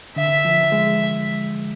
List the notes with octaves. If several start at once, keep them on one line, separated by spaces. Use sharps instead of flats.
D3 E5
F3
G#3